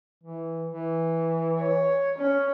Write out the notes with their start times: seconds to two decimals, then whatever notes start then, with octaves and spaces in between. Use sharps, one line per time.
0.23 E3
0.67 E3
1.60 C#5
2.18 C#4